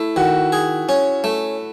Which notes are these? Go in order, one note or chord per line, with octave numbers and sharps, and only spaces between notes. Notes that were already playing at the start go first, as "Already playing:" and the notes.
Already playing: A3 E4
D#3 F#4
G#4
C#4
A3